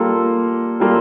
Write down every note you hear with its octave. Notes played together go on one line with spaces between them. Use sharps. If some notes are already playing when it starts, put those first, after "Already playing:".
Already playing: G3 A#3 F4 A4
G3 A#3 F4 A4